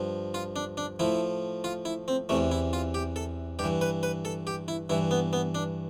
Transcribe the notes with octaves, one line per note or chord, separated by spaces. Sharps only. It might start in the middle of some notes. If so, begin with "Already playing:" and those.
Already playing: G2 F3
F4
D4
D4
A2 F3 E4
F4
E4
C4
E2 C3 E3 A3
E4
F4
G4
A4
G2 E3 G4
B4
B4
A4
G4
E4
G2 E3 E4
B3
B3
D4